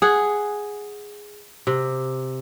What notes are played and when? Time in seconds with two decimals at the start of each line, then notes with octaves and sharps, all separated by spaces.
0.02 G#4 F#5
1.67 C3